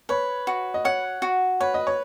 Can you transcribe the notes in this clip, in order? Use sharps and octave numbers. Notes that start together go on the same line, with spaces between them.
B4 C#5
F#4
D#5
C#5 F#5
F#4
B4 C#5
D#5
C#5